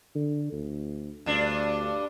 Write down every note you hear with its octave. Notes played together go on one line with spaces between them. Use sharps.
D3
D2
D2 G2 D4